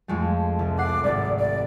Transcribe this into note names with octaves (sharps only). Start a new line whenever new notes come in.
F2 G#3 A3
C2
F#5 D6 C7
G#1 D5
D5